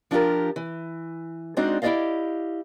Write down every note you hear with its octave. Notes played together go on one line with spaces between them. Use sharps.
F3 D4 F4 G4 A#4
E3
G#3 C4 D4 D#4 F#4 D5
E4 G4 G#4 D5 D#5 F5